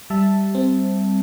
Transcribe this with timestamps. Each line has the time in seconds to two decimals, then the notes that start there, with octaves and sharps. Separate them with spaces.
0.10 G3 E5 A5
0.55 C4